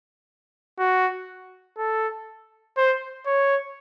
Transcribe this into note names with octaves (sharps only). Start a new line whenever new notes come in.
F#4
A4
C5
C#5